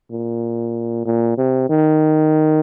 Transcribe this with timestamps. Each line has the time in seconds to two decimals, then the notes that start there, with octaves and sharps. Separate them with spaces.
0.11 A#2
1.06 A#2
1.38 C3
1.70 D#3